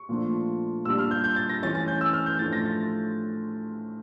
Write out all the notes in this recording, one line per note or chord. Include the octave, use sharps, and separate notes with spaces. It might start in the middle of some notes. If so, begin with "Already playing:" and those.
Already playing: C#6
A#2 F3 A3 D4
A#2 G3 D4 E6
F6
G6
G6
A6
A#6
E3 A3 C#4 A6
A6
G6
E6
F6
G6
A2 F3 A3 D4 A6
A#6
A6